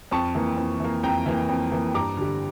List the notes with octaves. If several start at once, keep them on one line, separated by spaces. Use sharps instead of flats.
F2 A5 C#6
E3 A#3
F2
E3 A#3
F2 G5 A#5
E3 A#3
F2
E3 A#3
G2 A#5 D6
D3 G3